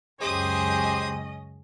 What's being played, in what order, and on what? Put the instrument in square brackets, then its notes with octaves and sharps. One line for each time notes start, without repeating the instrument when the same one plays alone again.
[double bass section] C#2 F#2 [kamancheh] C#4 D#5 [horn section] G4 C5 [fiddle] G#4 D#6